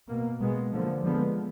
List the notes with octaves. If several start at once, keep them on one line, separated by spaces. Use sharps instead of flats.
B2 A#3
B2 G#3 B3
D3 F3 A#3
D3 F3 G#3 B3